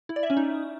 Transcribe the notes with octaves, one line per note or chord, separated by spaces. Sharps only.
E4
D5
E5
C#4
D#4